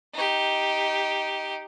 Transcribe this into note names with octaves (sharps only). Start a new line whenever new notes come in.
D#4 G4